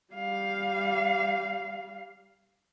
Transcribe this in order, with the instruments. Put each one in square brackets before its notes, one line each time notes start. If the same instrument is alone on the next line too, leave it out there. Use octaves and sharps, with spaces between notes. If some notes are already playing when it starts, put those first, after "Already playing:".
[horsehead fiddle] G3 F5